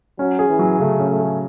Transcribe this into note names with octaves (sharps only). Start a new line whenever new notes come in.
F#3 C#4
G#4
E3
F#3
C#3 A3
C#4
A3
G#4